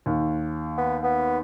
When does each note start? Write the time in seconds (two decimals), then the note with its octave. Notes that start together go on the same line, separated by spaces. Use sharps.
0.06 D#2
0.78 B3
1.04 B3